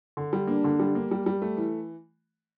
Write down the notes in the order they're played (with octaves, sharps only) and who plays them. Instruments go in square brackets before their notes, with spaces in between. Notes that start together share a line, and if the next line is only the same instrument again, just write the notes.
[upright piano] D3
G3
[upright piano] A#3 [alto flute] D4
[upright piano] D3
G3
A#3
G3
G3
A3
E3